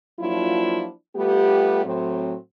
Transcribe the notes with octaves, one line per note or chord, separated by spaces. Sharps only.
F3 F#3 A#3 D4 E4 F4
G3 A3 B3 F4 G4
A2 F#3 C4